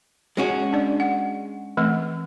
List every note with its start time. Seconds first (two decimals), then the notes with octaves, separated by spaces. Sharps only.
0.37 G#3 C#4 F#4
0.73 D4 D5
1.00 F#5
1.77 E3 A3 C4